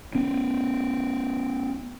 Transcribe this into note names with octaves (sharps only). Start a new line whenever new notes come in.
B3 C#4